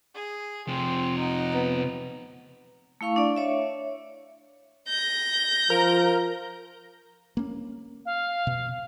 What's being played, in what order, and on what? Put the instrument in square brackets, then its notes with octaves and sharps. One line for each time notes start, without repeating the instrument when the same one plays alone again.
[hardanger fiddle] G#4
[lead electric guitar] C3 F3 [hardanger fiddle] C4
[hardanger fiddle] D#4 F#5
[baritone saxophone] B3
[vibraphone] A3 E4 F5 C#6
D4 D5
C#5 E5
[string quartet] G6 A#6
[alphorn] F3 [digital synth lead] A#4
[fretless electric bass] A#3 C#4
[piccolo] F5
[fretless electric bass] B2